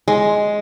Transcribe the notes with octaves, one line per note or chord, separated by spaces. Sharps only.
G#3